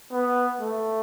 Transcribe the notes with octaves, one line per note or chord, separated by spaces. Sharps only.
B3
A3